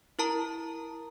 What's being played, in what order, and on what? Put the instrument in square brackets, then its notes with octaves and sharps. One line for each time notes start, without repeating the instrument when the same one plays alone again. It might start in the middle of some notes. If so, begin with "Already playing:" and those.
[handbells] E4 A#4 A5 A#5